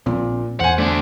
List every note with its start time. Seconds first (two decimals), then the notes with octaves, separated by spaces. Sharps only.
0.06 A#1 A#2 C4
0.60 E2 C5 F#5 G#5
0.78 A3 D4